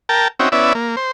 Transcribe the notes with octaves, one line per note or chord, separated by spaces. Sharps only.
A#4 G5 A5
C4 C#4 D#4 F#4 E5 G5
B3 C#4 E4 D5 E5
A#3
C5